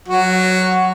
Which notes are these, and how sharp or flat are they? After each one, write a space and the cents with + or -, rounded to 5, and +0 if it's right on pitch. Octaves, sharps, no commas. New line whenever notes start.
F#3 +0 F#4 +0